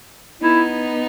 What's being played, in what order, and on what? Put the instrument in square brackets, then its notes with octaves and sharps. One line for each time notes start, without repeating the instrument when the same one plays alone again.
[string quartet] B3 D#4 [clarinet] E4